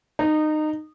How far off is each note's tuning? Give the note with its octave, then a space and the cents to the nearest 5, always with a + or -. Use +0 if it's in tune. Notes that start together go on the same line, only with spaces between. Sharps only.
D#4 -20